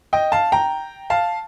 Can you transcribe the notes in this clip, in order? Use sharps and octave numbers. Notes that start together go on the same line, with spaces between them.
D#5 G5
F5 A5
G5 A#5
F5 A5